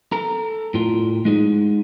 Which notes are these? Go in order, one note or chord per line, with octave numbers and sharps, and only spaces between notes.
A4 A#5
A2 F4
G#3 D#4 G#4